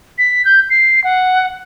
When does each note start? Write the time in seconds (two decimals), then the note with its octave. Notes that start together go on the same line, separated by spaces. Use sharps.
0.18 B6
0.45 G6
0.70 C7
1.04 F#5